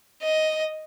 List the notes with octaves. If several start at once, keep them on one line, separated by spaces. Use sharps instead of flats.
D#5